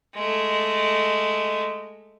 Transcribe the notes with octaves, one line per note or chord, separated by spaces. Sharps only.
G#3 A3